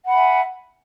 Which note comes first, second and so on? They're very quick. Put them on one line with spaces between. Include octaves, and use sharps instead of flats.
F#5 B5 G#5 E5